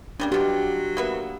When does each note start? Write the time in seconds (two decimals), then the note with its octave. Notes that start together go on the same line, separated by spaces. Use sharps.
0.20 C#3 G3 A#3 D4
0.32 B2 F#3 F4 G4
0.97 A#3 B3 E5